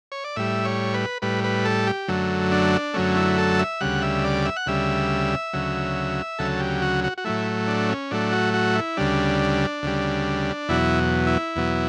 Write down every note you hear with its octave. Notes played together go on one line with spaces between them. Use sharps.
C#5
D5
A2 G3 E5
C#5
B4
A2 G3 B4
B4
A4
G4
F#2 D3 F#3 A3
D4
F#2 D3 F#3 A3 C#4
E4
A4
E5
D2 C#3 G3 F#5
E5
D5
E5
F#5
D2 C#3 G3 E5
D2 C#3 F#3
D2 C#3 F#3 A4
G4
F#4
F#4
F#4
A2 F#3 A3 E4
D4
C#4
A2 F#3 A3 D4
F#4
F#4
E4
D2 C#3 G3 D4
D2 C#3 G3
E2 B2 F#3 E4
E4
E2 B2 F#3